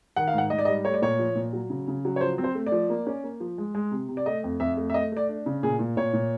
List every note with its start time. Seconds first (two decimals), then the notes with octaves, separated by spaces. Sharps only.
0.16 D#3 F#5
0.28 F5
0.33 G#2
0.38 F#5
0.50 G#2 D#5
0.59 D5
0.65 D#5
0.68 G3
0.85 A3 C#5
0.94 D5
1.02 A#2 C#5
1.19 F3
1.35 A#2
1.53 F#3
1.70 C#3
1.88 C#3
2.05 F#3
2.16 C#5
2.21 F3 C5
2.38 C4
2.44 C5
2.55 A3
2.66 D5
2.72 F3
2.89 A#3
3.07 C#4
3.24 A#3
3.40 F3
3.58 G#3
3.75 G#3
3.91 C3
4.08 C3
4.17 D5
4.26 A3 D#5
4.44 F2
4.60 F2 E5
4.77 A3
4.90 E5
4.94 A3 D#5
5.12 A3 D5
5.29 D4
5.46 C#3
5.63 A#2 G#4
5.79 A#2
5.97 A#2 C#5
6.13 A#2